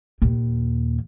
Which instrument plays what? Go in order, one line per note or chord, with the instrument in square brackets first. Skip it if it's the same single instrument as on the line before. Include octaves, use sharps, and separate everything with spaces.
[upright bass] D#2 A#2